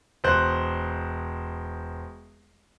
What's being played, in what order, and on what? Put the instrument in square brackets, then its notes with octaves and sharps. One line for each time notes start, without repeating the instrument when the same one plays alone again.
[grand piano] E1 C5 F#6